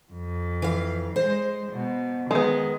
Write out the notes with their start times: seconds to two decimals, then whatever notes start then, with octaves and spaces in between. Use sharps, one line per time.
0.12 F2
0.62 E3 F5
1.16 G#3 C5
1.72 B2
2.31 D#3 G#3 B3